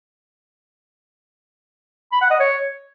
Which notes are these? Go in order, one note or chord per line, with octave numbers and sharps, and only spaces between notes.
B5
F#5
D#5
C#5